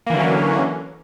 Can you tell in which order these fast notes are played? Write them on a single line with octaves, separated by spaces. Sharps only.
A#3 E3 D3 F#3 C#4